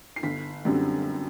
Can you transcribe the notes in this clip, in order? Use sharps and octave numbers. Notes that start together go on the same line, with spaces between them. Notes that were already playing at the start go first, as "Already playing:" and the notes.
C7
G1 B6
F#2 D3 G3 C4